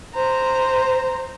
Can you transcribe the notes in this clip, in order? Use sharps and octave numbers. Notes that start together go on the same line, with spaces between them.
C5 A#5